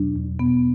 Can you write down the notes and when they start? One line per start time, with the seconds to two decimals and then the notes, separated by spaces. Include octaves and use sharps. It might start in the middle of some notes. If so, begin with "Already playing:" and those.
Already playing: E2 B2 F#3 D4
0.15 E2
0.39 B2 B3